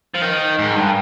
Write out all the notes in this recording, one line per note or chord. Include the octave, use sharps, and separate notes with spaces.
F3
D#3
G#2
G2